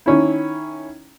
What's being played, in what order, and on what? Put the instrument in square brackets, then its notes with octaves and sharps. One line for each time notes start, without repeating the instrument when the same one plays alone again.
[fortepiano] D#3 C#4 E4